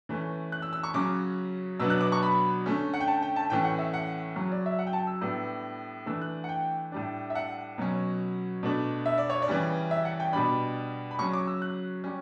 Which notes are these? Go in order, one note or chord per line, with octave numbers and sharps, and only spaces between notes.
E3 A3 C#4
F#6
E6
E6
C#6
C#3 F#3 C#4 D6
B2 F#3 B3 D4 E6
F#6
D6
C#6
B5
D3 A3 C#4
F#5
G5
A5
G5
A5
A2 E3 A3 C#4 G5
F#5
E5
F#5
C#3 F#3 C#4
D5
E5
F#5
G5
A5
E6
A2 G3 B3 D4
E3 A3 D4 E6
F#6
F#5
G5
A2 G3 D4
E5
F#5
B2 F#3 C#4
B2 A3 D4
E5
D5
C#5
D5
C#3 E3 G3 C#4
E5
F#5
G5
B2 G3 D4 B5
B5
C#3 F#3 C#4 C#6
D6
E6
F#6
G3 C#4